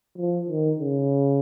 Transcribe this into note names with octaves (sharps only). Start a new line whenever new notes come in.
F3
D#3
C#3